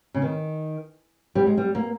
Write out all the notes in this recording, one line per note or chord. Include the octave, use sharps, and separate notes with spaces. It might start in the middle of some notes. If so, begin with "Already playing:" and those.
C#3
D#3
G3
G#3
G3
A#3